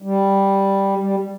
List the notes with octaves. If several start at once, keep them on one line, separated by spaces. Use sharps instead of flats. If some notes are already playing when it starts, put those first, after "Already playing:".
G3
G3